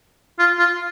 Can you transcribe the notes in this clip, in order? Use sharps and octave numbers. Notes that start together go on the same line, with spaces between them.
F4
F4